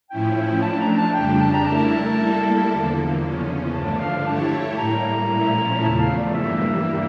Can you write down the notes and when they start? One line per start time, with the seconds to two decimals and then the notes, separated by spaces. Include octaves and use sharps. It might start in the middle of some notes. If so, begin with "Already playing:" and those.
0.10 A2 F3 C#4 E4 G5
0.51 G5
0.62 F3 A3 D4 A5
0.80 A#5
0.97 A5
1.14 F2 C#3 G3 D4 G4 G5
1.27 G5
1.41 A5
1.54 A#5
1.65 A3 E4 A#4 A5
2.18 G3 A#3 E4 A4
2.70 E2 D3 F3 A#3
3.23 E2 C#3 F3 C#4
3.74 G2 D3 F3 A3 D4 A5
4.00 F5
4.26 A3 E4 G4 C#5 A5
4.78 A2 G3 A#3 A#5
5.30 A#2 F3 A3 C#4 E4
5.82 E2 C#3 F3 A3 A5
6.00 F5
6.18 D5
6.34 G2 E3 G3 A#3 E5